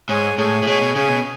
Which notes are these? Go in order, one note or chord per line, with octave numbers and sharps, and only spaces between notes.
G#2 G#4 C#5 G#5
A2 G#4 C#5 G#5
A2
B2 G#4 C#5 G#5
B2
C#3 G#4 C#5 G#5
B2